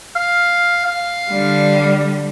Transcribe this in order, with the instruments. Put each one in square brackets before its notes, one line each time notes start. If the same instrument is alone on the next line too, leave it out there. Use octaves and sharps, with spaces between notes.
[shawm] F5
F5
[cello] D3 G3